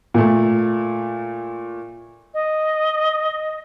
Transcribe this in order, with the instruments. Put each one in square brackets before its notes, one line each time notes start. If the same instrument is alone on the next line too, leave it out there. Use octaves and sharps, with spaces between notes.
[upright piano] A#2 A3
[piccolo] D#5